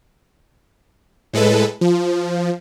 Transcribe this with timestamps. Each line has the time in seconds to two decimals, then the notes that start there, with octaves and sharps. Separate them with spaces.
1.33 A2 G#3 A4 B4
1.81 F3